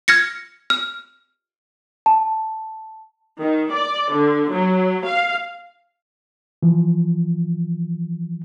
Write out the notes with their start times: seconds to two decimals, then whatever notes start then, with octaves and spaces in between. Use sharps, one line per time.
0.08 F6 G#6 A#6 C#7
0.70 F6
2.06 A5
3.40 D#3
3.73 D5
4.13 D3
4.52 F#3
5.05 F5
6.62 E3 F3